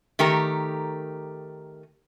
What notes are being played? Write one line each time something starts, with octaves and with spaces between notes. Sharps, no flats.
D#3 A3 G4 A#4 A#5